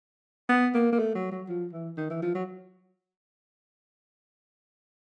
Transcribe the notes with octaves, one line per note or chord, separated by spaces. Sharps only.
B3
A#3
A#3
A3
F#3
F#3
F3
E3
D#3
E3
F3
F#3